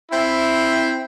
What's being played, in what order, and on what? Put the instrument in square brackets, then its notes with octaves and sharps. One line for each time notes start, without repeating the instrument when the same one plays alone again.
[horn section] C4 E4